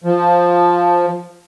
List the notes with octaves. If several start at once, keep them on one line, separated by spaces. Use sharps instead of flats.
F3